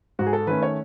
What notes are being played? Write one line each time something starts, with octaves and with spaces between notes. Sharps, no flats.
G#2 F#4
G#4
A4
D#3 A3 C#4 B4
C#5